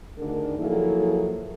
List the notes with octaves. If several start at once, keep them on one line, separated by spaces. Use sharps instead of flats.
D2 D3 D#3 D4 G#4 A#4
F3 F#3 A#3 E4 G#4 A4